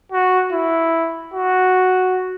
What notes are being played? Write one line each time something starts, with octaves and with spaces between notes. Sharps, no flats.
F#4
E4
F#4